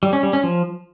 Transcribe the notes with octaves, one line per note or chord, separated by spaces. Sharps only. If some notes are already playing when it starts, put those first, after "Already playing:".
G3
C#4
G3
C#4
F3